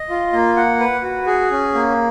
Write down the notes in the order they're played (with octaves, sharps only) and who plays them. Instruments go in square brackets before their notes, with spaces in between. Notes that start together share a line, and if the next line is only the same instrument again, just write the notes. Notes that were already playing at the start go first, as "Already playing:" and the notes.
Already playing: [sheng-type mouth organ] D#5
F4
A#3
F#5
B4
F#4
G#4
C#4
A#3